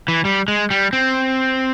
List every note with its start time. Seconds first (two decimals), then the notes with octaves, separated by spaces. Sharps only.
0.08 E3
0.25 G3
0.48 G#3
0.71 G3
0.93 C4